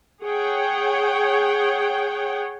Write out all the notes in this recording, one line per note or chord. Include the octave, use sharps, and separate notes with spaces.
G#4 C#5 F#5 G5